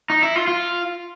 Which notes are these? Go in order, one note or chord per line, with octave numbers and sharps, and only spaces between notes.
D#4
E4
F4
F4